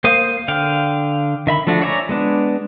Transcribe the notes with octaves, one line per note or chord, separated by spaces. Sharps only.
A#3 C5 F5 D#6
D3 F5 G5
D#3 E5 B5
F3 A3 D4 F#4
C#5 D5 E5 G#5 A#5
G#3 B3 D4